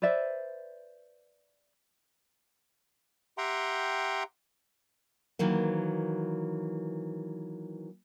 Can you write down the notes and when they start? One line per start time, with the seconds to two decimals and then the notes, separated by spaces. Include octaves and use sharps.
0.02 B4 C5 D5 E5
3.38 G4 E5 F#5 G5 A#5 C6
5.39 D#3 E3 F#3 A#3